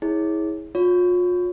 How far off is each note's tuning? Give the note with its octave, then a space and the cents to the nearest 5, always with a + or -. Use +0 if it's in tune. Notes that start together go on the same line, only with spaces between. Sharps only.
E4 -30 G#4 +0 C#5 +0
F4 +40 C#5 +15